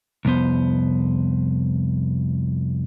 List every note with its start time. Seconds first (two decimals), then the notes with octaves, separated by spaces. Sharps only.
0.25 C2 F2 B3 C5